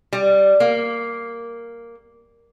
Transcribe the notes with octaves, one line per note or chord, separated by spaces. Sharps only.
G3
A#3